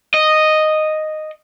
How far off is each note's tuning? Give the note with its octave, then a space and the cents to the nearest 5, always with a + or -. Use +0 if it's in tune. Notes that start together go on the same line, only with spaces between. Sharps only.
D#5 -5